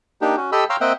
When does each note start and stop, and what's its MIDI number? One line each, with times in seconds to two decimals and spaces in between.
0.21 0.36 58
0.21 0.36 62
0.21 0.36 63
0.21 0.36 67
0.37 0.50 61
0.37 0.50 66
0.52 0.64 67
0.52 0.64 69
0.52 0.64 75
0.52 0.64 83
0.52 0.64 88
0.70 0.76 73
0.70 0.76 77
0.70 0.76 79
0.70 0.76 82
0.70 0.76 84
0.70 0.76 88
0.81 0.93 58
0.81 0.93 60
0.81 0.93 75
0.81 0.93 76
0.81 0.93 78
0.81 0.93 79